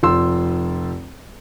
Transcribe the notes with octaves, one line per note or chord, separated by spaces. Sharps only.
F1 F3 C6 E6